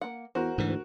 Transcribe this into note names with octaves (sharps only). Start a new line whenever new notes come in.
A#3 F#5
E2 F#4 A#4 C5
D2 G#2 E3